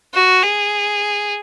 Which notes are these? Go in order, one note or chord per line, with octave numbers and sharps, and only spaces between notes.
F#4
G#4